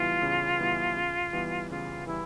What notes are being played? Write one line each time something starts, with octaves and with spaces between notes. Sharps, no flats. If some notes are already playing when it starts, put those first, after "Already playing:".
Already playing: C#3 E3 G3 B3 E4 F4
C#3
E3 G3 B3 E4
C#3
E3 G3 B3
C#3 F4
E3 G3 E4